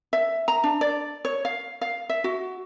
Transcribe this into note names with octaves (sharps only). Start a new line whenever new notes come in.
E5
A#5
D4
D5
C#5
F5
F5
E5
F#4